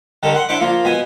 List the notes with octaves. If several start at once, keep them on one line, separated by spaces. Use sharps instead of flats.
D3 D#3 G3 A4 A#4
F#5 C6
D4 E4 C5 E5 C#6 D6
F3 A#3 F4
B2 B3 G#5